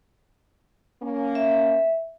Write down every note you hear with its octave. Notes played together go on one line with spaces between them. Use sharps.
A#3 C#4
E5